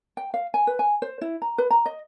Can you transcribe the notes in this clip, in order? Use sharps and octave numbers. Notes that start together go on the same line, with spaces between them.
G5
F5
G#5
B4
G#5
C5
E4
A#5
B4
A#5
D#5